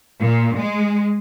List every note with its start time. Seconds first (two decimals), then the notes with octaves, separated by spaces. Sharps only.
0.20 A#2
0.58 G#3